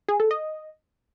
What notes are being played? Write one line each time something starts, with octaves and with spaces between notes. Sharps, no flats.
G#4
A4
D#5